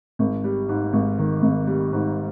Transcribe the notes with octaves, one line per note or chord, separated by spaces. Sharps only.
G#1
G3
G#2
G#1
D#3
G#1
G3
G#2